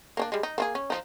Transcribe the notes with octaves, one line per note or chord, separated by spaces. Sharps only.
A#3 C#4 D4
G3 G#3
D#4
A#3 F4 G#4
C#4
F3 D#4